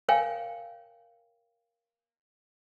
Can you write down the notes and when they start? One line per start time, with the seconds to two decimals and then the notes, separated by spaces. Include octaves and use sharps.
0.09 A#4 C#5 F5 G5 G#5